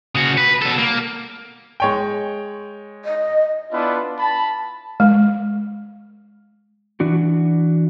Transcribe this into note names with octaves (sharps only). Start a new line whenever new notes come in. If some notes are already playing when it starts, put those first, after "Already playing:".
C#3 F#4
B4
B2 A4
A#3
G#3 C#5 G5
D#5
B3 D4 E4 F4 B4
A5 B5
G#3
E3 D4 F#4